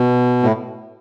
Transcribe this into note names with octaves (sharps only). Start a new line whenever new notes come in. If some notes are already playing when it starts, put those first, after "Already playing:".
Already playing: B2
A2